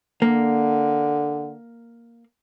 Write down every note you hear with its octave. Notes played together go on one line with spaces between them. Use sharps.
D3 A#3